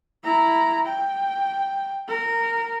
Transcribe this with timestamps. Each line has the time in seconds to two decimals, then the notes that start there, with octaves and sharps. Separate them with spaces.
0.24 E4 A#5
0.86 G5
2.08 A#4